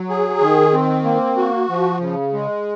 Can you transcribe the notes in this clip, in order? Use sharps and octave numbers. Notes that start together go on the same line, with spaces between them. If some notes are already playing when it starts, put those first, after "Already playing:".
Already playing: F#3
G#4
D#3
C4
A#3
F#4
F3
C#3
G#3